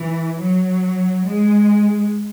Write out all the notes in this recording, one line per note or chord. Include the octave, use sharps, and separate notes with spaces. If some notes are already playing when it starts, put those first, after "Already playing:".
Already playing: E3
F#3
G#3